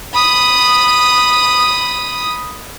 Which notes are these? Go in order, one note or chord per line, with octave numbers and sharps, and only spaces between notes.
B5 D#6